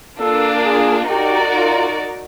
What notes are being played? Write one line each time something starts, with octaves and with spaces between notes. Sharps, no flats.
A#3 D4 F4 A4
G#4
D#4 F#4 G4 A#4 D5
F4